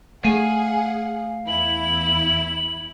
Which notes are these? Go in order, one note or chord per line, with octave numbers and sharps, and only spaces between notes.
A3 G#4 F5 F#5 G#5
E2 E4 F#7